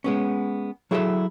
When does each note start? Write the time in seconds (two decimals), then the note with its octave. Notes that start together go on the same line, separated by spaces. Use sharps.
0.04 G#3 B3 C#4
0.91 F#3 E4 G#4 A4 B4 E5